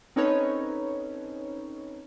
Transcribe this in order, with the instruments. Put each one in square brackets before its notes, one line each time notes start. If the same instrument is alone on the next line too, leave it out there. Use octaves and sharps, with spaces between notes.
[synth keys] C4 C#4 D#4 A4 B4 C#5